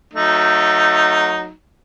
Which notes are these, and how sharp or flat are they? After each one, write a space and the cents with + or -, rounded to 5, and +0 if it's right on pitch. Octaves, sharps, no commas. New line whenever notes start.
F#3 -20 A3 +15 D#4 +0